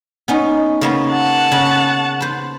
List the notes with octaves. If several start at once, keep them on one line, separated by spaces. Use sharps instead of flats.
B3 C#4 D#4
C#3 A#3 B3
F#5 A5
C#3
B4 C5